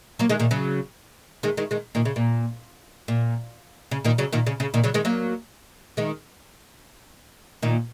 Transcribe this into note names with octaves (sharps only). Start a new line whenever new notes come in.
F#3 A#3
D#3 G#3
A#2 D#3
C#3 F#3
D#3 G#3
D#3 G#3
D#3 G#3
A#2 D#3
C#3
A#2
A#2
C#3
A#2 D#3
C#3 F#3
A#2 D#3
C#3
C#3
A#2 D#3
C#3 F#3
D#3 G#3
F#3 A#3
D#3 G#3
A#2 D#3